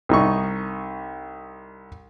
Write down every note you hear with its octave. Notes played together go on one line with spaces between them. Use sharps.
C2 D#4 C#6